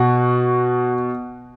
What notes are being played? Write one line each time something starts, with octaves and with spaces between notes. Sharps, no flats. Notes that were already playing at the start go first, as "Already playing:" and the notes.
Already playing: B2 F#4